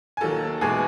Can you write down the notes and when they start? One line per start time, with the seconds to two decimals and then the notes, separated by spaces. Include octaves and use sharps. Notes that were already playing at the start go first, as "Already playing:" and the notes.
0.17 G#5
0.21 D#2 D#3 F#3 A4 A5
0.61 E2 B2 G#3 G#4 G#5